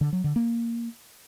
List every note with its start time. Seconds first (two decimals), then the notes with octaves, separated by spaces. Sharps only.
0.01 D3
0.13 F#3
0.24 D3
0.36 A#3